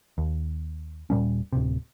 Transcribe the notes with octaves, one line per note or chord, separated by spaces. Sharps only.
D#2
D#1 A#2 G3 C#4
D1 C3